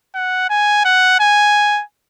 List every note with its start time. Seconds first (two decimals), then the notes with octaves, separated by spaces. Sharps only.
0.15 F#5
0.50 G#5
0.85 F#5
1.20 G#5